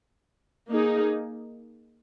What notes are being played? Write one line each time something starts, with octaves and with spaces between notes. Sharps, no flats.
A#3 D#4 G#4